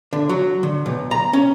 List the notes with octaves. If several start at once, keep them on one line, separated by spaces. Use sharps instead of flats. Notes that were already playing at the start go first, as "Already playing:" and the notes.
D3
F#3
D3
B1
A#5
C#4